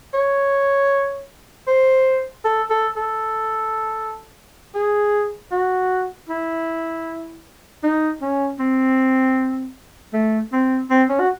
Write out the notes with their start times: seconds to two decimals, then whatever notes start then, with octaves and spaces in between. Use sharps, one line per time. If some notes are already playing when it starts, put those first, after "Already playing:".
0.14 C#5
1.67 C5
2.45 A4
2.70 A4
2.97 A4
4.75 G#4
5.52 F#4
6.29 E4
7.83 D#4
8.21 C#4
8.59 C4
10.13 A3
10.52 C4
10.90 C4
11.09 C#4
11.20 F#4